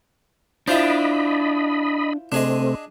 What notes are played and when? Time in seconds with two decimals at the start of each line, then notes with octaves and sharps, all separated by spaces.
0.68 D4 E4 F4 C5 D#5 B5
2.32 C3 A3 C4 D4 G#4 D#5